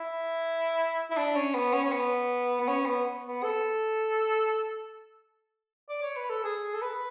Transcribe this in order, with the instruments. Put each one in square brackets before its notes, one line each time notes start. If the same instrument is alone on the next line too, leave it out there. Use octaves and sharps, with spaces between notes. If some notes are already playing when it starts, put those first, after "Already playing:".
Already playing: [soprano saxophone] E4
E4
D4
C#4
B3
C#4
C#4
B3
B3
C#4
B3
B3
A4
D5
C#5
B4
A4
G#4
A4
B4